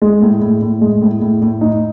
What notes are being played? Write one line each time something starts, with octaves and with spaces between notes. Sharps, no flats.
G#3
A2
A2
A2
G#3
A2
A2
A2
D#4